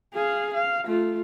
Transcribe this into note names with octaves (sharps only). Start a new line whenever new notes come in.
G#4 F5
F5
A3 F4